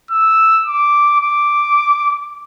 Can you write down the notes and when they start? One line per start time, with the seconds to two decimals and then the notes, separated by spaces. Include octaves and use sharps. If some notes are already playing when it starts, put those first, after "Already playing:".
0.11 E6
0.66 D6
1.21 D6